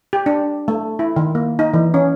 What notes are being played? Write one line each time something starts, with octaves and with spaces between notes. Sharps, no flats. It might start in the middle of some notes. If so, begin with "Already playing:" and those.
G4
D4
A3
E4
D#3
A#3
D#4
E3
C#4